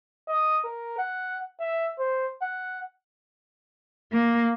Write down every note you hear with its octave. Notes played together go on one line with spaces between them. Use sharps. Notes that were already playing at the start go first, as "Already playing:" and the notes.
D#5
A#4
F#5
E5
C5
F#5
A#3